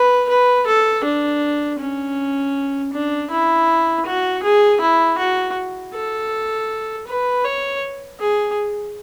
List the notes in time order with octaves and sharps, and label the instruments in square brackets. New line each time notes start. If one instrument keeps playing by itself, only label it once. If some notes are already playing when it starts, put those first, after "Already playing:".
Already playing: [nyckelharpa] B4
B4
A4
D4
C#4
D4
E4
F#4
G#4
E4
F#4
A4
B4
C#5
G#4